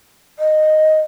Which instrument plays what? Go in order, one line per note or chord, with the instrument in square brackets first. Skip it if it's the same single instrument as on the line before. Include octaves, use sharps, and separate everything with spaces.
[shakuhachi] D#5